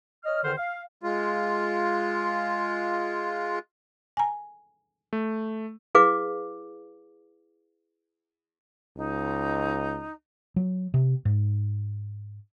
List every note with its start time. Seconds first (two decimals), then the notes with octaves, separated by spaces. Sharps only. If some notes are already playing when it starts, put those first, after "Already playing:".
0.24 C#5 D#5 F6
0.43 E2 D3 D#3 C5 F6
0.57 F5
1.03 G#3 F4
4.17 G#5 A#5
5.13 A3
5.95 E4 G#4 B4 F5 D6
8.97 C#2 D#4
10.56 F#3
10.94 C3
11.25 G#2